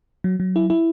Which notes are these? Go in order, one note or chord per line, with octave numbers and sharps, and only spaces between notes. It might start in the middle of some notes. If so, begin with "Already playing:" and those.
F#3
F#3
E4
E4